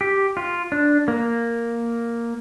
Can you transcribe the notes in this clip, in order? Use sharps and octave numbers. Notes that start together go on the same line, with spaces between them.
G4
F4
D4
A#3